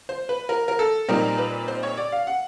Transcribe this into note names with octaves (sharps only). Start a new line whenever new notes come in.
C5
B4
A#4
A#4
A4
A#2 G3 C4 D#4 A#4
B4
C5
C#5
D5
F5
F#5